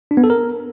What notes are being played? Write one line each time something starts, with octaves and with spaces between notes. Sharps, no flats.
D4
B3
A4
A#4